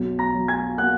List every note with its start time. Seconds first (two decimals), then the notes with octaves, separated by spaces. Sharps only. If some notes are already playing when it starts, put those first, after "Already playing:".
Already playing: B1
0.19 A#5 A#6
0.34 F#3
0.48 G#5 G#6
0.77 A#3 F#5 F#6